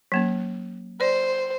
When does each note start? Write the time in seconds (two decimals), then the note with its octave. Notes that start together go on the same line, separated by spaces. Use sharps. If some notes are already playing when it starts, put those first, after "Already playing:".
0.12 F#3 A#3 C#4
1.01 C5 D5